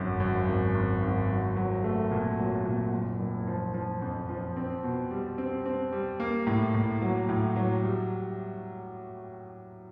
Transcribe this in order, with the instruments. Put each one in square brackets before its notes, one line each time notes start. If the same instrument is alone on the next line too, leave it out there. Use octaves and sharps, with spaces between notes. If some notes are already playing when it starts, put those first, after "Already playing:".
Already playing: [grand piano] G#1 F#2
F#2
G#1
G#1
G#1
F#3
F#3
A3
A#2
F#3
A#2
F#1
F#1
F3
F3
F2
F3
C4
B2
G3
C4
C4
G3
A#3
A2
A2
F#3
A2
F#3
G3